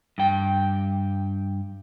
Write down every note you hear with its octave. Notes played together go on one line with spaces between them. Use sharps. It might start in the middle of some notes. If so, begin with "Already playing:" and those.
G2 G5